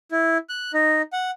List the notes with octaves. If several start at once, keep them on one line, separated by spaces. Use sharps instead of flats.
E4
F#6
D#4
F#5